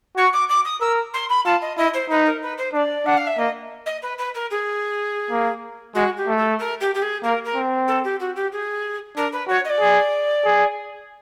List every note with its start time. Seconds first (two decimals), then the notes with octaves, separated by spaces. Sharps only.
0.17 F#4 C#6
0.33 D6
0.49 D6
0.65 D#6
0.81 A#4 E6
1.13 C6
1.29 B5
1.45 F4 A5
1.61 D#5
1.77 E4 D#5
1.93 C5
2.10 D#4 B4
2.25 A#4
2.42 B4
2.57 C5
2.73 D4 D5
3.06 D4 F#5
3.17 F5
3.27 E5
3.38 A#3 D#5
3.86 D#5
4.02 B4
4.18 B4
4.34 A#4
4.50 G#4
5.31 A#3
5.94 G#3 F#4
6.17 G4
6.27 A3
6.37 A4
6.59 A#4
6.80 G4
6.94 G4
7.02 G#4
7.23 A#3 A#4
7.44 A#4
7.55 C4
7.87 A4
8.04 G4
8.20 F#4
8.35 G4
8.52 G#4
9.17 D4 A#4
9.32 B4
9.48 F#4 C#5
9.65 D#5
9.69 D5
9.80 G#4
10.45 G#4